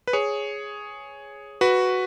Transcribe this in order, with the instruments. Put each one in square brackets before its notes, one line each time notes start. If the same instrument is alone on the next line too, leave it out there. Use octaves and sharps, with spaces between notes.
[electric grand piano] B4
G#4 C#5
F#4 B4